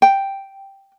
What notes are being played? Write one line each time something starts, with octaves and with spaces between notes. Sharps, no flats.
G5